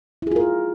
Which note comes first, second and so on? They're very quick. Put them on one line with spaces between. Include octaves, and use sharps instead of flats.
E4 G#4 F4 A#4